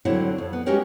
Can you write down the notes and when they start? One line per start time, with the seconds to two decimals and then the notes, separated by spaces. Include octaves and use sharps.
0.05 D3 F#3 C4 E4 F#4 C#5
0.38 F2
0.53 B3
0.66 G#3 C#4 F#4 G4 A#4 C#5